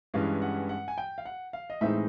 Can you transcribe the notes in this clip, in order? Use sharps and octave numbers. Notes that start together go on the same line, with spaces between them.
G2 E3 G#3 C#4 F5
F#5
F#5
G#5
G5
F5
F#5
F5
D#5
A2 E3 G#3 C4 D#4 E5